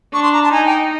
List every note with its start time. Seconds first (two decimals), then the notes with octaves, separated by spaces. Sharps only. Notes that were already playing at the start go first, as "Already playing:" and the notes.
0.13 D4 C#6
0.23 C6
0.33 A#5
0.44 A5
0.52 D#4 G#5
0.66 G5